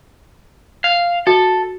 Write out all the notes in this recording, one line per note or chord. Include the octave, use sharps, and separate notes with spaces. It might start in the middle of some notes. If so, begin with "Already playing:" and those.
F5
F#4 A4